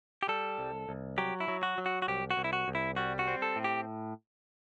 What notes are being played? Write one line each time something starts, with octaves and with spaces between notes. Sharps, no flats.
G4
G3 A4
C2
C2
F#3 G4
E4
F#3
F#4
F#3
F#4
F#4
C2 G4
F#4
C2
E4
F#4
C2
E4
G3 F#4
F#4
C4
A4
A2
G4